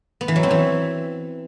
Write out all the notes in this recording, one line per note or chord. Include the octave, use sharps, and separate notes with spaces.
B3
E3
F#3
C4
E3